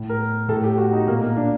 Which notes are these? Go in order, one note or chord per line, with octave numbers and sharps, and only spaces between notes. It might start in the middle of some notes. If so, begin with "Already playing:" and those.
Already playing: A2
A#4
A2 A4
G4
F#4
D#4
A#2 A#3
A#3
D4